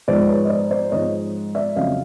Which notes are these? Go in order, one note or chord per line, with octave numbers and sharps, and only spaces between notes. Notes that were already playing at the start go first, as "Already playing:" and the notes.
G#2 F3 G#3 C5 D5
B4 C#5
D#5
C5 D5
C5 D5
G#2 F3 G#3 C#5 D#5
D5 E5
F2 C#3 F#3 D#5 F5